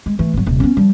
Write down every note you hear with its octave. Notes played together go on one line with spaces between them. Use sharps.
G#3
E3 A3
G#1 F#3
D#1 C2
B3 C#4
F3 G3